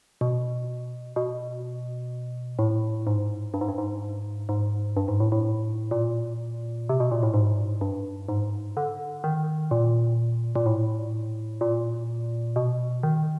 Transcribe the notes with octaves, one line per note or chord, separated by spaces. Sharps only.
B2
B2
A2
G#2
G2
G#2
G2
G#2
G#2
G2
G#2
A2
A2
A#2
C3
B2
A#2
A2
G#2
G2
G#2
D3
D#3
A#2
A#2
A2
A#2
B2
D#3